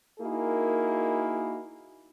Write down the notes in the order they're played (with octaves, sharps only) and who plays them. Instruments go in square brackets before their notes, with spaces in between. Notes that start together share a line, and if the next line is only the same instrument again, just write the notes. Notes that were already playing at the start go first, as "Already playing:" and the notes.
[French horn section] A#3 D#4 E4 F#4 G#4 A#4